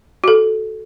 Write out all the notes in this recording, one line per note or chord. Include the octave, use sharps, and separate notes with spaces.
F#4 A4